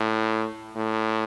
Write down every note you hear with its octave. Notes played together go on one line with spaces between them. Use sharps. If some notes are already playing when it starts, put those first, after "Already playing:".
Already playing: A2
A2